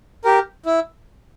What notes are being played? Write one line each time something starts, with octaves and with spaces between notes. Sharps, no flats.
G4 A#4
E4